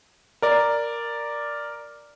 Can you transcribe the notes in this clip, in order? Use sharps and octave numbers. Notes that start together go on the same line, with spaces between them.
A#4 D5